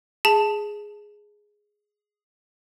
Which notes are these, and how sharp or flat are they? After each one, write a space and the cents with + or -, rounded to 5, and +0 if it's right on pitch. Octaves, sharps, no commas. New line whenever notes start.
G#4 +0 A5 +0